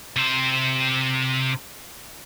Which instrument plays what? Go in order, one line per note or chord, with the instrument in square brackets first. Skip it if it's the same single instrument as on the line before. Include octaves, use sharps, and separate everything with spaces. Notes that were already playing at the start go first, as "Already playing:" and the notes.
[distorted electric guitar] C3 C5